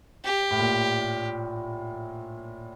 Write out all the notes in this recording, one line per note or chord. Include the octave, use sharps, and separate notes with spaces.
G4
A2
A#2